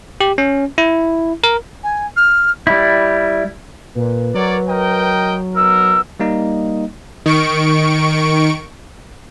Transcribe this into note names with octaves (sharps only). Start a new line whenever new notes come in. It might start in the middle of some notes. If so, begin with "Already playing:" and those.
G4
C#4
E4
A#4
G#5
F6
G3 E4
A#2 B4
F#3 A#4 C#5 D5
A#4 D#5 G5
B3 D#4 A#4 E6
G3 A#3 D#4 D#5
D#3 C#6 D7